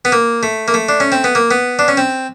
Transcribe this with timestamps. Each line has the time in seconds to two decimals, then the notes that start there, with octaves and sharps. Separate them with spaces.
0.05 B3
0.12 A#3
0.43 A3
0.68 A#3
0.74 A3
0.89 D4
1.00 C#4
1.12 C4
1.24 B3
1.35 A#3
1.51 B3
1.79 D4
1.88 C#4
1.97 C4